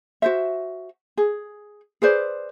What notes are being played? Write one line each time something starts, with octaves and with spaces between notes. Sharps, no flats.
F#4 C5 E5
G#4
G#4 B4 C5 D5